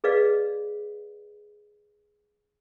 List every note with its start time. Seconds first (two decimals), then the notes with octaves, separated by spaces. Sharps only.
0.04 G#4 B4 D5 D#5 F5